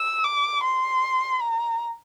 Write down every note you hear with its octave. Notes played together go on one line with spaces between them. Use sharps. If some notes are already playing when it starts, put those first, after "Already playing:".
Already playing: E6
D6
C6
A#5